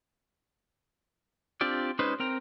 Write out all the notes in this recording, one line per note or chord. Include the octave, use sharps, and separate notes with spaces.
C4 D4 F4 G4 D5
G#3 C#4 D#4 B4 C5
C4 A#4 G5 A#5